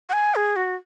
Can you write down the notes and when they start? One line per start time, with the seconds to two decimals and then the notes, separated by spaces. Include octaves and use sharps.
0.09 F#5
0.13 G#5
0.35 G#4
0.56 F#4